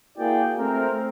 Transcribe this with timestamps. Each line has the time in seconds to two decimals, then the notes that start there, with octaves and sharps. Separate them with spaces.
0.18 A#3 E4 F#4 G#4 D5 G5
0.58 A3 C4 A#4